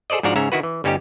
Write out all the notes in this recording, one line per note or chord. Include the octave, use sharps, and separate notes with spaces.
G#4 A4 C5 D5 D#5
G#2 F3 D4 F#4 D5 A#5
G#2 C#3 C#4 E5 A#5
D#3 E4 F#4 B4
E3
G1 G3 C#4 D#4 G4